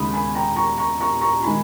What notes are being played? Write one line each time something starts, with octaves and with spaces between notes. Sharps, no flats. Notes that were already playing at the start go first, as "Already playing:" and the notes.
Already playing: D#2 C#3 G#3 B5 D#6
G#5 B5
G5 A#5
A#5 C#6
A#5 C#6
A#5 C#6
A#5 C#6
D#3 G#3 G#5 B5